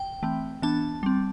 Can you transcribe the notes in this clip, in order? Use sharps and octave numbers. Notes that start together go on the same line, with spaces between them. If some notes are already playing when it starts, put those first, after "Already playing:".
Already playing: G5
E3 A3 C4
E3 B3 D4 A5
G3 C4